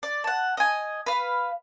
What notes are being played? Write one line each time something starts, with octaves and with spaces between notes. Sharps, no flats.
D5
F#5 A5
D#5 G#5
B4 F5